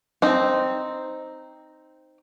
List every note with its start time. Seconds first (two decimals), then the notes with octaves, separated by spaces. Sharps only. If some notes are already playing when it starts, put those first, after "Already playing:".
0.22 C4 D#4